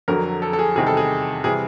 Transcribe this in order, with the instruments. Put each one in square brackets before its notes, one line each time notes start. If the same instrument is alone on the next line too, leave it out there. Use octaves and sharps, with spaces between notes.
[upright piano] F2 D3 F#3 A#4
A4
A4
G#4
E2 C3 D#3 G3 G#4
A4
G#4
C3 E3 G3 G#4